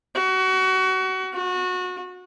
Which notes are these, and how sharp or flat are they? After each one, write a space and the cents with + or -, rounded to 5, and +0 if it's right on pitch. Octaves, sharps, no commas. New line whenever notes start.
F#4 +25
F#4 -25